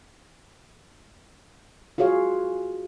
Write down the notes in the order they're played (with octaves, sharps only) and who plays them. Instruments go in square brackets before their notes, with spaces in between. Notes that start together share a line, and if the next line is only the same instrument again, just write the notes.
[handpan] F4 F#4 G#4 C#5 F5